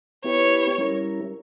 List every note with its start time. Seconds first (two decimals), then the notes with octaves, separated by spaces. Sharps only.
0.24 B3 E4 G4 B4 C#5
0.78 G3 C#4 E4 A#4